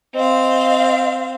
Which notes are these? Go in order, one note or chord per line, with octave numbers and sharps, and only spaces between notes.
C4 D#5 F5